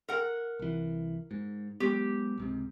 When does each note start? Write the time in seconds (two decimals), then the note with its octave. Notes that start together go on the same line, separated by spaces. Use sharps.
0.09 A#4 F#5
0.59 C2 E3
1.31 G#2
1.80 F#3 G#3 B3 G4
2.38 C#2 G#2 C3